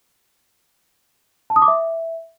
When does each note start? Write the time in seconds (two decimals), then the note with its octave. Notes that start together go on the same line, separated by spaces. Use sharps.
1.50 A5
1.56 D#6
1.62 D6
1.68 E5